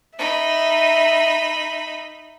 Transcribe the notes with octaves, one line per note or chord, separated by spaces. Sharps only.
D#4 E5 B5